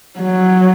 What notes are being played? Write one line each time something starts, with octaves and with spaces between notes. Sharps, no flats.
F#3